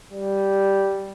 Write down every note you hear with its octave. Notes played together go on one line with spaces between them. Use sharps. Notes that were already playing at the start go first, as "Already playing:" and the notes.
G3